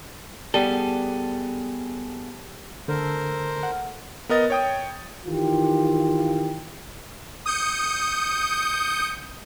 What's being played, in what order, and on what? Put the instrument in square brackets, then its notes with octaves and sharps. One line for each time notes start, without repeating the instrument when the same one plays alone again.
[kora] G3 [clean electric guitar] B3 G#4 A4
[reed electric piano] D3 [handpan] A4 [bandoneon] A#4 C5
[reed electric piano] F#5
[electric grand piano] B3 A#4 D#5 A6
C#5 G5 D#6
[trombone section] D#3 E3 F4 G4
[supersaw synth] D#6 G6 C#7